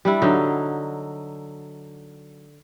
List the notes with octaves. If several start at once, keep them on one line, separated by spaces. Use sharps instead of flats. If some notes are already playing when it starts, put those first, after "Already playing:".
G3 D4 E4
D3 F#3 D#4